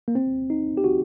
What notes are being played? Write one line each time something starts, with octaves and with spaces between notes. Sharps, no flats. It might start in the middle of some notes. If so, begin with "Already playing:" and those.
A#3
C4
D#4
G4
F#4